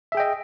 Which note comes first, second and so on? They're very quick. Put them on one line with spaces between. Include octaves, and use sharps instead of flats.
E5 G#4 G5 D#5